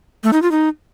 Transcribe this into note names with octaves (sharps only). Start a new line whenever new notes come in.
A3
D#4
F4
D#4